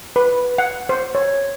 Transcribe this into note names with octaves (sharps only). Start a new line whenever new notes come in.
B4
F#5
C5
C#5